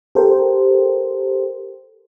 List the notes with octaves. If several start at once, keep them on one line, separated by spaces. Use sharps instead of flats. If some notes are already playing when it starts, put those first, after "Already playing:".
G4 A4 A#4 C5